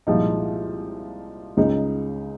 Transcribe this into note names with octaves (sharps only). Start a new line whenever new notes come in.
C2 A#2 F3 G#3 D#4
C#2 C#3 G#3 D#4